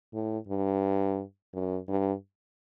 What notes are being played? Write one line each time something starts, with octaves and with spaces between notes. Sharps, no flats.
A2
G2
F#2
G2